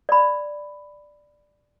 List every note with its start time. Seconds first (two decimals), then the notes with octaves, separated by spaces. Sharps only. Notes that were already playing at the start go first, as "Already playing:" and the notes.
0.09 D5 B5